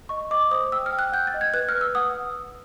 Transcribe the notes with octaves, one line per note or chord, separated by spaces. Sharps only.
D#5 C#6
D#5 D6
C5 D#6
G5 E6
F6
G5
F#6
F#5 G6
A6
D#5
G#6
B4 F#6
F6
B4
E6
F#5 D#6